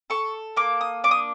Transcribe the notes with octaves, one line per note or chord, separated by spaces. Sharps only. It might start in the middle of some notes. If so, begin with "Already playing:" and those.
A4 C#6
A#3 D6
D#6
D4 D6
D#6